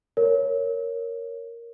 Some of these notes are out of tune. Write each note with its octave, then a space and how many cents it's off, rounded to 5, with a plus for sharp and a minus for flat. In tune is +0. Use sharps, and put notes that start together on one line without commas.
A#4 +0 C#5 +0